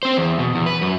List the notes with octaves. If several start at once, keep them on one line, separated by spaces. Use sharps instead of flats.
C4 C5
E2
B2
E2
B4
F#2